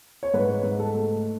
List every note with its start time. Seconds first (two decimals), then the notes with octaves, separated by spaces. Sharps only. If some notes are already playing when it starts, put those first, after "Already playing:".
0.23 C#5
0.34 G#2 B4
0.63 G#2
0.79 A4
0.95 A3